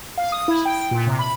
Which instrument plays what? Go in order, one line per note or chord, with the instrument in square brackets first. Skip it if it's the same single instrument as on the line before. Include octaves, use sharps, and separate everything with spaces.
[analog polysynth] F5
D#6
E4
G5
A#2
C3
B5